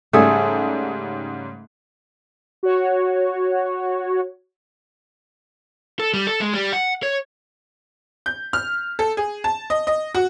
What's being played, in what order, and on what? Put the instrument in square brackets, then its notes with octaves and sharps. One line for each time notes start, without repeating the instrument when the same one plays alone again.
[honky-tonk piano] G#2 C#3 G3 [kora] A3 G#4
[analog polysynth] F#4 C#5
[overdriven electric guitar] A4
G3
A4
G#3
G3
F#5
C#5
[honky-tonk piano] G6
F6
A4
G#4
A5
D#5
D#5
F#4